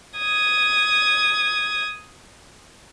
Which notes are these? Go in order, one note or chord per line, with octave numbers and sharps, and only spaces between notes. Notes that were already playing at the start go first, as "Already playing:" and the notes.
D#6 G#6